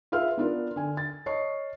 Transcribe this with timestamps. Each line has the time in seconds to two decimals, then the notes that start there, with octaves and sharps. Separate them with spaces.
0.12 F4 G#4 B4 E5 F5 F6
0.37 B3 D4 F4 A#4
0.76 D3 G#5
0.97 A6
1.26 C#5 D#5 A5 C#6 C7